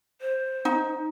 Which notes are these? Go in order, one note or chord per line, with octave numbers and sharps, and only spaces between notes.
C5
D#4